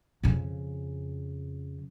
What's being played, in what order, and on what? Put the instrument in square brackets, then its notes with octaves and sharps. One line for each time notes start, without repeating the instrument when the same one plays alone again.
[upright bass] F2 C#3